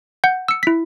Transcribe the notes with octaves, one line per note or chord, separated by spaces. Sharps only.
F#5 G6
E6 C#7
E4 B6